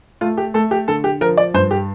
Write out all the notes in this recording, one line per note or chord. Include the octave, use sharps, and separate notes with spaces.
A3 F4
G4
A3 A4
G4
D3 A4
G4
F3 A#4
D5
G2 C5
G4